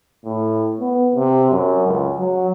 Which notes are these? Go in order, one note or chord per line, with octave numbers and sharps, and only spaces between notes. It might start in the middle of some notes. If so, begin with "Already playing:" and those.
A2
B3
C3
F#2
C#2
F#3